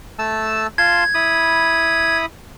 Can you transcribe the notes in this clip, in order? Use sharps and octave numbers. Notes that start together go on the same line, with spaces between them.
A3 A5 E6
F4 A5 C6 G#6
E4 B5 D#6